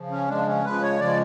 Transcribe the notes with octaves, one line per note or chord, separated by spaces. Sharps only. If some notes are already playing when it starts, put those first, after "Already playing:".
Already playing: C#3 F3
C#4
C#3 F3 G#3 D4
C#4
C#3 F3 G#3 B4
C#5
C#3 F3 G#3 D5